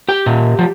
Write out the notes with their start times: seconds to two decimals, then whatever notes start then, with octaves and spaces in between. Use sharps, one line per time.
0.09 G4 G5
0.26 A#2
0.59 F3